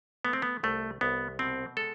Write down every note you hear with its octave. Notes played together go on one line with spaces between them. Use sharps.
A3 B3
C4
B3
C2 A3
C2 B3
B2 C4
G#3 A4